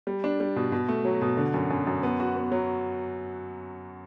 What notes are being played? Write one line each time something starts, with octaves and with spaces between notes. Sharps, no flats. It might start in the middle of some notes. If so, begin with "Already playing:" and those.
G3
D4
G3
B2
B2
A3
F#3
B2
D3
F#2
F#2
F#2
B3
F#4
B3
F#3